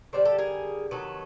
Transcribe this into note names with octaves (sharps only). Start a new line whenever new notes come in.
D3 G3 C5 D5
G4 A4
G#4 A#4
C3 D#3 F#3 A4 B4